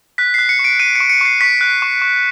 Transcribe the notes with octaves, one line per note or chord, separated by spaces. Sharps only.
F#6 B6
F#6 C7
C#7
C#6
D7
F#6 D#7
C#6 C#7
C#7
C#6 C7
C#6 B6
F#6
C#6
C#6